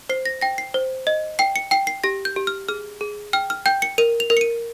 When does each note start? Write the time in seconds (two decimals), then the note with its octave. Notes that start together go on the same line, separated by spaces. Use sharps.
0.09 C5 C7
0.26 A#6
0.41 G5 A#6
0.58 C7
0.74 C5
1.07 D#5
1.39 G5 C7
1.56 C#7
1.71 G5 C7
1.87 C7
2.04 G4 A#6
2.25 G6
2.36 G4
2.47 F6
2.68 G#4 F6
3.01 G#4
3.33 G5 F6
3.50 F6
3.66 G5 G6
3.82 C#7
3.98 A#4 D#7
4.20 F7
4.30 A#4
4.37 C#7
4.41 D#7